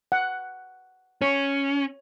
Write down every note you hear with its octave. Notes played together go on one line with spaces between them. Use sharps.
F#5
C#4 C#5